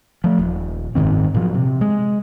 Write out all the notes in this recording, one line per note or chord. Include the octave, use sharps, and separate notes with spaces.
F3 A3
D#1
F#1 G#2 D#3 C4
A#2 F3 F#3
C3
G#3